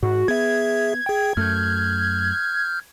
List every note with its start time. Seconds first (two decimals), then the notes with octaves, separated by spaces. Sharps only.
0.03 G#2 F#4
0.28 B3 G#4 E5 G#6
1.06 G#4 G5
1.37 F#2 A3 F6 G6